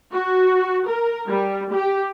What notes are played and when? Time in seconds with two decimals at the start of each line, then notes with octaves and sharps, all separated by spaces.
0.12 F#4
0.88 A#4
1.28 G3
1.72 G4